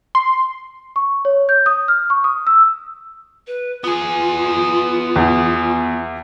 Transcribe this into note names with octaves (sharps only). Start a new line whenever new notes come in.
C6
C#6
C#5
G6
D#6
F6
C#6
D#6
E6
B4
B3 F4 G#4
E2